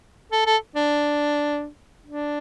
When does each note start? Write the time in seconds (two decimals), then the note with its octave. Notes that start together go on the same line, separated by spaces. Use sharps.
0.32 A4
0.46 A4
0.76 D4
2.06 D4